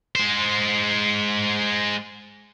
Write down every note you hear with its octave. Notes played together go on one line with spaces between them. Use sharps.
G#3 C5